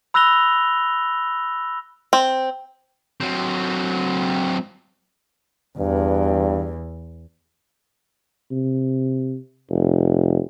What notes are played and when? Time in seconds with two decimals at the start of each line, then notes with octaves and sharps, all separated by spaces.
0.14 B5 E6 F#6 A#6 F7 G7
2.13 C4
3.20 F#3 C4
5.78 E2 G2
8.51 C3
9.70 F1